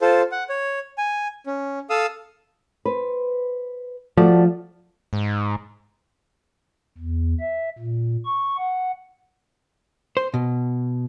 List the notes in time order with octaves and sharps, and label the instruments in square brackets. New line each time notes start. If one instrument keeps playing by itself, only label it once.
[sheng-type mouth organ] F4 A4 C5
F#5
C#5
G#5
C#4
A4 F5 D#6 E6
[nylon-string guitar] B4 C5
[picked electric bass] F3 [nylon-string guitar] A3 F#4 D5
[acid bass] G#2
[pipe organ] E2
E5
A#2
C#6
F#5
[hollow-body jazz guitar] C5
B2